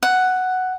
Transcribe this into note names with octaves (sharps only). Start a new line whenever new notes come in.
F#5